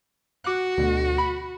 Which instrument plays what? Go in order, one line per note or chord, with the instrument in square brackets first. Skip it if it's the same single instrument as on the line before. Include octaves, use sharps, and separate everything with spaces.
[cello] F#4 [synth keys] D6 F#6
[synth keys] D2 B2 D3
B5